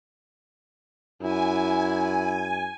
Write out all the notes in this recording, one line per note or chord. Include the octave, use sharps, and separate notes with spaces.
F#2 E4 G#5